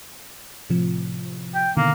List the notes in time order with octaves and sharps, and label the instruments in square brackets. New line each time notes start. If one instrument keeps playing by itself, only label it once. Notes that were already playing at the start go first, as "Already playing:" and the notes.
[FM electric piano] A2 C3 F3
[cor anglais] G5
[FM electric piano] B2 D3 D#3 [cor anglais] A#3